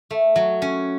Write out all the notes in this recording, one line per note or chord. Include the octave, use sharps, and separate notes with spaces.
A3
F#3
C#4